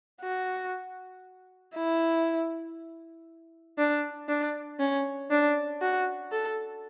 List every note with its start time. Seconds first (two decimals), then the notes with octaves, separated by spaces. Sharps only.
0.22 F#4
1.75 E4
3.78 D4
4.28 D4
4.79 C#4
5.30 D4
5.81 F#4
6.32 A4